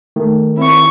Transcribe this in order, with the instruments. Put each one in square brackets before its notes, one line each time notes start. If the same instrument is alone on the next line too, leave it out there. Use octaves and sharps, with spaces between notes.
[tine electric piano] D#3 [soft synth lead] A3
[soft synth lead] C4 [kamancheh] E4 C#6